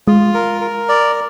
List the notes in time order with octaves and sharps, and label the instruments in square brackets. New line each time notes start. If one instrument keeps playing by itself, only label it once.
[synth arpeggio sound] G#3 [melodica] F4
[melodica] A#4
A#4
D5